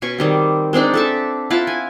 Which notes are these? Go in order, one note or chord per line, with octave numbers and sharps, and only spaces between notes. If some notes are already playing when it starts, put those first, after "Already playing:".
B2 C#4 G#5 C#6
D#3 G3 C4
G#3 C4 D4 D#4
A4 E5 A5
E4 F4 F#5 A5
G#5